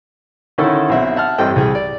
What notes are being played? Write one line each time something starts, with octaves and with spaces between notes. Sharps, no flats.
D3 D#3 C#4 D#4 E4 A4
B1 C4 E5 F#5
E5 F#5 A5 F6
A1 G2 C4 A4 D#5 G5
C2 G#4 G5
D5